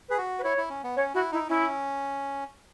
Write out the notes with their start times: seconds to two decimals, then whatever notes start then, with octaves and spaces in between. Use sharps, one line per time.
0.09 G#4 B4
0.18 F#4
0.39 B4
0.44 E4 C#5
0.57 E4
0.70 C#4
0.84 B3
0.96 C#4 C#5
1.14 E4 F#4
1.32 D#4 E4
1.49 C#4 E4